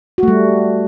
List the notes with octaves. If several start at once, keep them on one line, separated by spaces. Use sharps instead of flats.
G3 A3 F#4